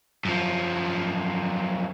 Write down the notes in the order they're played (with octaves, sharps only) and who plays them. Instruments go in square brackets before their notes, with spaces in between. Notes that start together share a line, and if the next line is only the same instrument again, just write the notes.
[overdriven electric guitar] F#2 F3